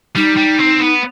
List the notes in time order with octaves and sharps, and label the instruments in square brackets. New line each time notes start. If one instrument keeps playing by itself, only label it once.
[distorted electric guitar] G3 [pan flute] D#4
[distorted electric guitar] G3
C4
B3